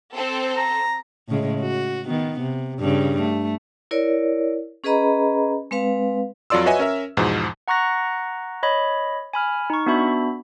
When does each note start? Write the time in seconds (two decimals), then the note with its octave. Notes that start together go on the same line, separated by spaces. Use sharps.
0.14 C4 A4
0.57 A#5
1.29 A2 C#3 G#3
1.61 F#4
2.06 D#3 B3
2.41 C3
2.80 G2 C#3
3.22 A3
3.91 E4 A#4 C#5 D5
4.84 C#4 G#4 B4 D#5 A#5 B5
5.71 G#3 C4 B4 F5
6.50 F2 F#3 F4 D5 C6 E6
6.66 F#4 B4 C#5 D#5 E5 G#5
6.79 C#4 A#4 E5
7.17 E2 G#2 B2 F3
7.68 F#5 A#5 C#6 F#6 A#6
8.63 C#5 D#5 B5
9.34 G#5 B5 F6
9.70 D#4 C#6
9.86 B3 D4 F#4 E5 B5